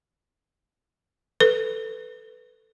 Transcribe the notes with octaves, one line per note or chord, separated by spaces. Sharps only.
A4 B4